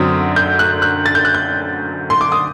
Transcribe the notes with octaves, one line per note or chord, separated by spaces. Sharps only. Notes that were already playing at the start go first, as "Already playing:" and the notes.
Already playing: F#2 D3 F#3 C4 D#6
G6
F#6
F#6
A6
G6
F#6
G6
C6
D6
D#6